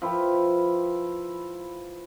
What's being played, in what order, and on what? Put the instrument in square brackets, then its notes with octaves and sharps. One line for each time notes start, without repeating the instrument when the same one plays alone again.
[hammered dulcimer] F3 E4 B4 G5